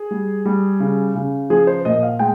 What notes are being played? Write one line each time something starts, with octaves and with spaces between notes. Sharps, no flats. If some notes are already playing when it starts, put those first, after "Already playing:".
Already playing: G#4
G3
G3
C#3
C#3
F3 G#4
C5
A#2 D#5
F5
G#3 G5